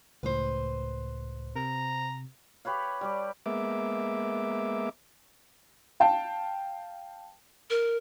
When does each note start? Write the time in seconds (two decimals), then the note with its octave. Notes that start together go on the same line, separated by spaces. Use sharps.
0.23 C#2 A2 B4 C5
1.56 C3 A#5
2.65 G4 B4 C#5 F5
3.01 G3 A5 D6
3.46 G#3 A#3 B3 E5 D6
6.00 F5 G5 A5
7.70 A#4